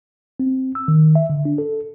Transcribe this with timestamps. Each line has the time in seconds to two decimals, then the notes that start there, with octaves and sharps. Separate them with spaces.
0.40 C4
0.75 E6
0.88 D#3
1.15 E5
1.30 D3
1.45 D4
1.58 A4